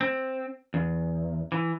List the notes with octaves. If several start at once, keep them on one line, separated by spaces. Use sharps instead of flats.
C4
E2
E3